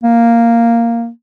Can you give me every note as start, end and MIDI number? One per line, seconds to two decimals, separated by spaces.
0.03 1.09 58